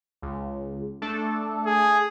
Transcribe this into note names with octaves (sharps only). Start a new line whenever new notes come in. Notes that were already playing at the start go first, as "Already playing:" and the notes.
C#2
A3 D4 A4
G#4